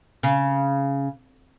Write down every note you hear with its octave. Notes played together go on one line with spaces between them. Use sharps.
C#3